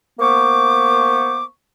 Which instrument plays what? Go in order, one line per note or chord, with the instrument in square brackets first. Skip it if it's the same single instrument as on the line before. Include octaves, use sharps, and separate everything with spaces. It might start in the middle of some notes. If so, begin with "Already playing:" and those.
[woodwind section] A#3 B3 C5 C#6 D6